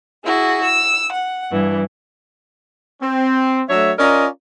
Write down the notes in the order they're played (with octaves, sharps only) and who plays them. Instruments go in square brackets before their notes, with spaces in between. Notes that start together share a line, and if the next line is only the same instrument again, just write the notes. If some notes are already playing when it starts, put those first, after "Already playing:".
[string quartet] E4 F#4 G#4
E6
F#5
G2 E3
[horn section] C4
F#3 A3 D4 C#5 E5
C#4 F4 A#4 D5 D#5 A#5